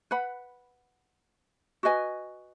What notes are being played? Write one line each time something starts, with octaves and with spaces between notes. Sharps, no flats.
B4 F#5 B5
F#4 B4 D#5 G#5